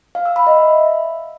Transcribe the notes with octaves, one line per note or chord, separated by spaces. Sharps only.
F5
E6
B5
D#5
E5